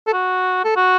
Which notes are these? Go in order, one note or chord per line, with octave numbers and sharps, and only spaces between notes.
A4
F#4
A4
F#4